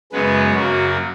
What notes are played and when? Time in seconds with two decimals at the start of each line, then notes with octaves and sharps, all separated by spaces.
0.12 F#2 C#3 G#3 B3 B4
0.55 F#2 C#3 F#3 A#3 F#4